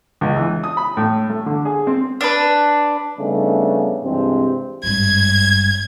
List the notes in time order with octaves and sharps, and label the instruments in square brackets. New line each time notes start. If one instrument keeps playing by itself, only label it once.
[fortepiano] C#2
E3
D#6
B5
A2
A3
D3
G#4
C4
[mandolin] D4 B4
[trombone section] C#3 G3 A3 B3 D4 D#4
G2 C3 E3 G#3 C4
[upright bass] G#1 G2 [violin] G#6